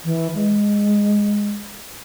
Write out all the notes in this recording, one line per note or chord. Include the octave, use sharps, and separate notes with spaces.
E3
G#3